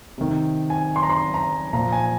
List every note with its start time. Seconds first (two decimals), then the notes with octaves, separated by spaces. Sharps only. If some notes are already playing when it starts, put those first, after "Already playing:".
0.18 C3 D#3
0.70 G#5
0.96 C6
1.03 A#5
1.10 C6
1.34 A#5
1.73 A#2 F3 A#5
1.92 G#5